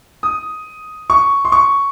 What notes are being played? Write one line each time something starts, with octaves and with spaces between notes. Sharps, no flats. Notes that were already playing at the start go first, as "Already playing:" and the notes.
D#6
C#6
C6
C#6